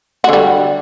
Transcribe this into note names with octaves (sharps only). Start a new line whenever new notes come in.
D3 G3 F#4